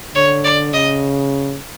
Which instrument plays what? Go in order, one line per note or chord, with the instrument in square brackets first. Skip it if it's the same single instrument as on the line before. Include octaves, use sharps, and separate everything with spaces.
[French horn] D3 [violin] C#5
[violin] D5
[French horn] C#3 [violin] D#5